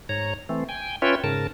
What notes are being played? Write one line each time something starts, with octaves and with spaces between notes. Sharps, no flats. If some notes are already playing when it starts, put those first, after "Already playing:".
G#2 C#5 A#5
E3 A3 C4
G5 G#5
C#4 F4 B4 C#5 E5 G5
G#2 C#3 A#4 A5